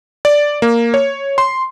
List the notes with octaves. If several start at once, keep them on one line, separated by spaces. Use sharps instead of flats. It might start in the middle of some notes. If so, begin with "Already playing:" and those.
D5
A#3
C#5
C6